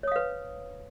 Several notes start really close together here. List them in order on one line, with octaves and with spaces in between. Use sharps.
C#5 D#6 F5 B4